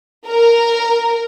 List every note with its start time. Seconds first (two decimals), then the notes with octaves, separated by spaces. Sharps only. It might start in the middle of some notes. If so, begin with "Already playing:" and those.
0.27 A#4